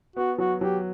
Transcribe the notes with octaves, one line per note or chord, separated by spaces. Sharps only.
B3 F#4
F#3 F#4
F#3 G4